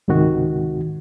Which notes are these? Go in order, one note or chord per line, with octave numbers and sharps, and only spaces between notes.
C#2 G#2 C3 D#3 F#4